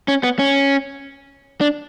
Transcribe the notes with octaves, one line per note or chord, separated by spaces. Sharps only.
C#4
B3
C#4
D4